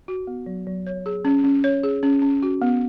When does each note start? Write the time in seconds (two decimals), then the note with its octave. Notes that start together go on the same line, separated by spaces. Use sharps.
0.08 F#4
0.27 B3
0.46 F#3
0.67 F#3
0.87 C#5
1.06 G#4
1.25 C#4
1.44 C#4
1.64 C#5
1.83 G#4
2.03 C#4
2.22 C#4
2.43 F#4
2.62 B3